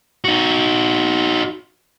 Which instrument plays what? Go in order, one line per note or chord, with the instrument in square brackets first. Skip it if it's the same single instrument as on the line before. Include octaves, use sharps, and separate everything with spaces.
[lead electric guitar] D#4 F#4